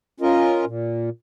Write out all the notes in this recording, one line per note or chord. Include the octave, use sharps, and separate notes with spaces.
C#4 F4 A#4 D#5
A#2